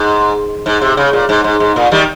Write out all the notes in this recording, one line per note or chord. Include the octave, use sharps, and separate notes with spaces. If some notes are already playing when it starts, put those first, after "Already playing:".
Already playing: G#2
G#2
C3
C#3
A#2
G#2
G#2
G#2
A#2
D#3 G3